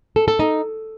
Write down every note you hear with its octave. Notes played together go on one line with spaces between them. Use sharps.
A4
A4
D#4